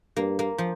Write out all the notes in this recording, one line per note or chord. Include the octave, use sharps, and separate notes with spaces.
G2 A#3
A#3
F3